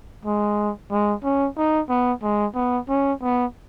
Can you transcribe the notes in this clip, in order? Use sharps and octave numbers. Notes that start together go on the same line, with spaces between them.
G#3
G#3
C#4
D#4
B3
G#3
B3
C#4
B3